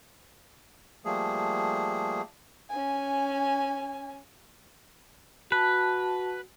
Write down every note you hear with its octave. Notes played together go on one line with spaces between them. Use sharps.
F3 G3 A3 A#3 G#4
C#4 G#5
F#4 B4 A5